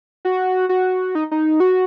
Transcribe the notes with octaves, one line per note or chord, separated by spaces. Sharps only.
F#4
F#4
D#4
D#4
F#4